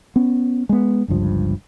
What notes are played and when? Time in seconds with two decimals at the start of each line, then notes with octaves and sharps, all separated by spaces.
0.16 B3 C#4
0.69 G#3 B3
1.08 G1 C#2 G2 F3